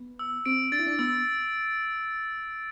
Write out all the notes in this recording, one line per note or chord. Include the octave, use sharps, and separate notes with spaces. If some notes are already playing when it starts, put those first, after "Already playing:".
Already playing: B3
E6
C4 D7
D4 A6
E4
D4
B3 E6